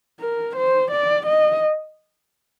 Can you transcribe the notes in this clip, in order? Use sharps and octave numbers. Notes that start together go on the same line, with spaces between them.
A#4
C5
D5
D#5